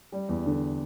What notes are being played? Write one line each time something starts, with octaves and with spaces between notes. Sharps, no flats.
G3
E2
D3